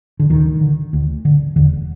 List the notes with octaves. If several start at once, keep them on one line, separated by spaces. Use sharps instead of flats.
D3
D2 D#3
D3
D2
D3
E1 D3